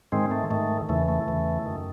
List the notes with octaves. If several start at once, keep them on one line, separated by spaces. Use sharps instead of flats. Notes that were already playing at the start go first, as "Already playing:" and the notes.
G#2 D#3 G#3 C4
A3
G#2 D#3 A3
E2 C#3 E3 A3
A3
E2 C#3 E3
F#2 D#3